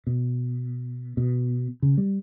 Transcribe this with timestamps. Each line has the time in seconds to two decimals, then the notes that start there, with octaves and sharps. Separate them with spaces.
0.07 B2
1.17 B2
1.82 C#3
1.97 G3